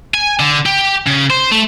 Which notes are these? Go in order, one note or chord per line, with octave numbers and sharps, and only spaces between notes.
G#5
D3
G4
C#3
C5
A3